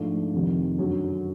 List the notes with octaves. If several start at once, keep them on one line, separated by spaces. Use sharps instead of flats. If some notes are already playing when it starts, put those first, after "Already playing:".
Already playing: G#2 F3 A3 D4
F2 C3 D#3 G3
F#2 D3 F#3